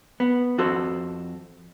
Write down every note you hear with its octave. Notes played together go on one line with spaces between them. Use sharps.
B3
F2 F#4 A4 C5